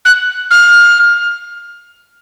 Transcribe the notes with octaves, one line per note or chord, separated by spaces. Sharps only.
F#6
F6